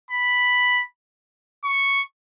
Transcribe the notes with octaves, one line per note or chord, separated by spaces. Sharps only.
B5
C#6